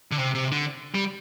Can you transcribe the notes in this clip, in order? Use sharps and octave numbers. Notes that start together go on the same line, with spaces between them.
D3
C3
C3
D3
G3